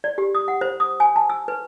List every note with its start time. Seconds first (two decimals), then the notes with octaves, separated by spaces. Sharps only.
0.04 D5
0.18 G4
0.35 D#6
0.48 F#5
0.61 C5
0.80 D#6
1.00 G#5
1.16 A5
1.30 E6
1.48 B4